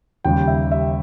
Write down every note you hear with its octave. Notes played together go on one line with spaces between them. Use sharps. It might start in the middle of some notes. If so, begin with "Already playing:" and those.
D#2 C#3 G3 G5
E5
E5